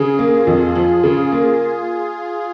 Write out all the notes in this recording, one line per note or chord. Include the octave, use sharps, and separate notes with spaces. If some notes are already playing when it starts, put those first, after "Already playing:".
Already playing: C#3 G#4
A#3
F4
F2
F3
C#3
A#3